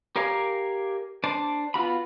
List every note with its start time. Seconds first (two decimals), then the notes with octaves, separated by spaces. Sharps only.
0.16 G4 A#4 D5 F5 G#5
1.24 D4 C5 D5 A5
1.74 B3 F4 F#4 B5